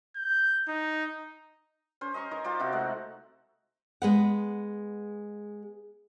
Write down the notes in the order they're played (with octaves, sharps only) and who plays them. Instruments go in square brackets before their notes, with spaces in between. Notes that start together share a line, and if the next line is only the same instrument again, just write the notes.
[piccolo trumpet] G6
D#4
[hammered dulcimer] C#4 C5
D#5 A#5 C6 C#6
D#4 A#4 C#5
F4 G4 C5 D5
C3 D#4 F#4
G#3 A3 F#5
[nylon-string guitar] G#3 B3 F#5